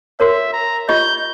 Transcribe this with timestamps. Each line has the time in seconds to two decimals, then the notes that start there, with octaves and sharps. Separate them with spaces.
0.20 F#4 A#4 C#5 E5
0.53 A#5
0.89 F4 G4 D#5 G6